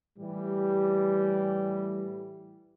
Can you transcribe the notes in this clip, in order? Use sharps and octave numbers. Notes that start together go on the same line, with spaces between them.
A2 E3 G3